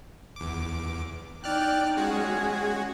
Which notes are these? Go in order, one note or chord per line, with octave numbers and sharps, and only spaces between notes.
E2 D6
D#4 D5 G5 F6 F#6
G#3 C#4 F#4 G#4